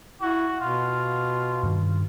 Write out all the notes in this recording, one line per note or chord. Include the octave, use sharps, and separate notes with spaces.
E4 F#4
B2 F4
G2 D#3